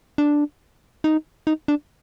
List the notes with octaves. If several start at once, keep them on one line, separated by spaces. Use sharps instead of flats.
D4
D#4
D#4
D4